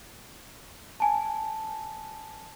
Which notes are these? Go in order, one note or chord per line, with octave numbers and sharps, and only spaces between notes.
G#5 A5